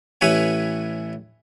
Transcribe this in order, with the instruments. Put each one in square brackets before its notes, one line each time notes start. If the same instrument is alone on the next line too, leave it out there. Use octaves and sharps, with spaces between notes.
[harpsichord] A1 E4 B4 C#5 G#5